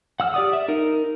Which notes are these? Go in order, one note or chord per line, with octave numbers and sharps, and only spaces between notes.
F#5 E6 F6
G4 D5 D#6
E5
D#4 A#4